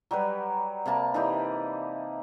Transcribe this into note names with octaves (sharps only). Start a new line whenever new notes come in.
F#3 G3 G4 B4
C3 A#3 A5 B5
E3 D#4 G4 D5